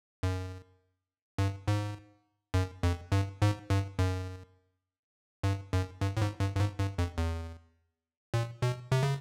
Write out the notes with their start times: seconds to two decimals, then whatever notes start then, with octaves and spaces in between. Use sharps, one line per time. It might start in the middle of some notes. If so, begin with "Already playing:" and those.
0.23 F#2
1.38 G2
1.68 G#2
2.54 F#2
2.83 F2
3.12 G2
3.42 G#2
3.70 G2
3.99 F#2
5.44 G2
5.73 F#2
6.01 G2
6.17 A2
6.22 G#2
6.40 G2
6.55 G2
6.60 G#2
6.80 G2
6.98 F2
7.18 E2
8.34 A#2
8.62 B2
8.92 C3
9.03 C#3